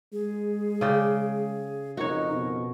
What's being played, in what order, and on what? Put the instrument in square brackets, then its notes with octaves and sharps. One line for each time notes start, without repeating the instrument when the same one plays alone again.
[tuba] G#3 [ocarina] G#4
[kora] C#3 D5 G5
[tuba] F2 [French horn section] D#4 [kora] F#4 C#5 [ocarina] A#4
[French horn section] B2